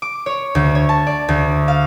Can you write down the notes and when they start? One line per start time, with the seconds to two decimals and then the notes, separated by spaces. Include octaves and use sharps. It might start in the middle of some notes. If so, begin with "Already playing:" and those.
0.02 D6
0.26 C#5
0.55 D2
0.75 C#5
0.89 A5
1.07 D5
1.29 D2
1.68 F5